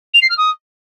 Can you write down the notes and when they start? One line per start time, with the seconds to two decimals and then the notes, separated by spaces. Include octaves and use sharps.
0.14 F7
0.21 C7
0.29 F6
0.37 D#6